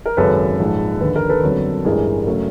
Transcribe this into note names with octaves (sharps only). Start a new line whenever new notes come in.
A#4
G#1 F#2 C#3 F#3 A4 B4
A#1 G#2 F3 G#3
D#2 D3 F3 B4
A#4
A4 B4
G1 F2 D3 F#3
A1 G2 E3 G#3 G#4 A#4
C#3 F#3 A3